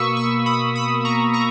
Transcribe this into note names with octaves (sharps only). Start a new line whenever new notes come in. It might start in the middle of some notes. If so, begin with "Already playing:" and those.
Already playing: B2 A#3 B5 C#6 D#6 E6
C#6 E6
B5 D#6
B5 D#6
A#5 C#6
A#5 C#6